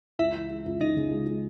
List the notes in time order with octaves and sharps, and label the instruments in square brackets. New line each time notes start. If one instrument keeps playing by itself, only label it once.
[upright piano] C#2 [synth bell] E4 E5
[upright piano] E3
G#3
C#2
[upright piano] C#3 [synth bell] D#4 D#5
[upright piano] C#3
G#3
G#3